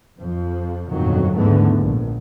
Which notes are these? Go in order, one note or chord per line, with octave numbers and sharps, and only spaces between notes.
F2 F3
G1 F2 A#2 D#3 F#3
D#2 G#2 D3 E3 A3 B3
A#1